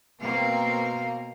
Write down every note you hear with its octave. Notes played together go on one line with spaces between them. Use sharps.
B2 A#3 C4 F5